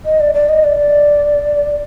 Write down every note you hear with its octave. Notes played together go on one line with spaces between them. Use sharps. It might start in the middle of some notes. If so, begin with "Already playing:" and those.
D#5
D5
D5
D#5
D5